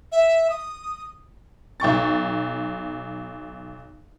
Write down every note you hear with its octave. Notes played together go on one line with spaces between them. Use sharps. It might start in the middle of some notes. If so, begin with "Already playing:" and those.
E5
D#6
B1 G5 C#6 A6